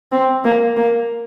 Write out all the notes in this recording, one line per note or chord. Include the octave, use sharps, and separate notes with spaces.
C4
A#3
A#3